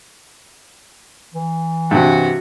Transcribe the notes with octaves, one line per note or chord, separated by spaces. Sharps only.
E3
G2 C3 F#4